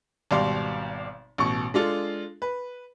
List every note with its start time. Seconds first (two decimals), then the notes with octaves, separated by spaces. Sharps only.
0.31 G#1 B2 G3 D5 F5 C6
1.38 A1 B2 C#6
1.74 G#3 D4 F4 A4
2.42 B4